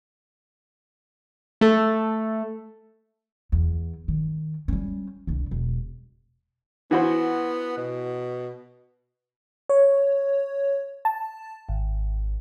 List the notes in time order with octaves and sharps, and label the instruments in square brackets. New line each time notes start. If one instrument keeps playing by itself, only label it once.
[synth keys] A3 A4
[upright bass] E2
D#3
G3 C#4
C2 D4
E1
[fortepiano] E3 F#4 C5 [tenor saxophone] B3
[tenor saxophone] B2
[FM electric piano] C#5
A5
G#1